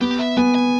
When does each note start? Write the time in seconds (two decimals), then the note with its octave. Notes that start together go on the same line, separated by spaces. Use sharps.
0.01 B3 G4
0.11 G5
0.19 E5
0.37 B3 G#5
0.55 G#5